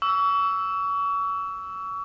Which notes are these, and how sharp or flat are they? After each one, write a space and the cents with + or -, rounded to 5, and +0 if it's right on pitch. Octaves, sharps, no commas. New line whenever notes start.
C#6 +35 E6 +0